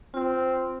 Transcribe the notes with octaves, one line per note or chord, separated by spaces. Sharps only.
C4 F4